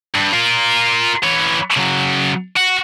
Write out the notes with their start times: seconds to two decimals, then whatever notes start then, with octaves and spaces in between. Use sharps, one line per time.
0.14 G2
0.33 F4 A#4
1.23 E3 C#5
1.77 C#3 F#3
2.56 F#4